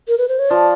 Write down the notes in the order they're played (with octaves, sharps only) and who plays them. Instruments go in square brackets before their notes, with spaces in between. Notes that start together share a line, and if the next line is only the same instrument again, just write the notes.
[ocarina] A#4
B4
C5
C#5
[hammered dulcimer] F3 [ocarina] D5